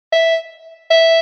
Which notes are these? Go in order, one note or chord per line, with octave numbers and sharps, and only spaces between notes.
E5
E5